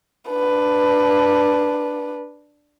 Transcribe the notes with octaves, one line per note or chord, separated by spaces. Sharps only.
D4 B4